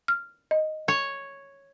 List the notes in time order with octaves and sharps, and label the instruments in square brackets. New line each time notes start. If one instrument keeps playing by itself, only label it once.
[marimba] F6
D#5
[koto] C#5